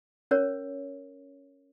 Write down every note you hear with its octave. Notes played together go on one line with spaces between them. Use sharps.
C#4 A#4 C#5